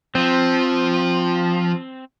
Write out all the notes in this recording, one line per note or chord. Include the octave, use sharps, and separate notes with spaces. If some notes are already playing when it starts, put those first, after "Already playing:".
F3 C4